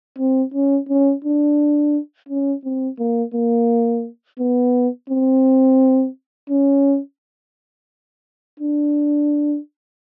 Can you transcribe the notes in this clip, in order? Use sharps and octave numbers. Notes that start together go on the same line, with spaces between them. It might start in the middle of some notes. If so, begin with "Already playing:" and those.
C4
C#4
C#4
D4
C#4
C4
A#3
A#3
B3
C4
C#4
D4